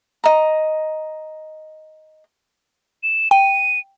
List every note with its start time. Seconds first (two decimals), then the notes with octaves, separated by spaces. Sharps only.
0.24 D#5 A#5
3.03 E7
3.31 G5 D#7